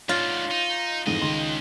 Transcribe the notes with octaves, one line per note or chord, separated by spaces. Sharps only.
G#2 D3 F4 C#5
D#4
F2 G#2 C#3 E3 D#5
C#2 D#3 C6